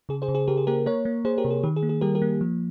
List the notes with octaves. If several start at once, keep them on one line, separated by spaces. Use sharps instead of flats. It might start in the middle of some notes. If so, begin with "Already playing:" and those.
C#3 G#4
G#4 C5
C#3
G#4
C#3 G4 A#4
G#4
A#3 G4 A#4
A#3 A#4 C#5
A#3
A#3 G#4 C5
G4 A#4
C3
G#4
D#3 G4
G#4
A#3
G#4
G3 G4 A#4
G4 A#4
A#3
F3